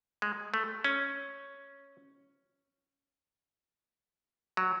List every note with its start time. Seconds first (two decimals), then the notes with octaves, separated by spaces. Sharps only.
0.22 G#3
0.54 A3
0.84 C#4
4.57 F#3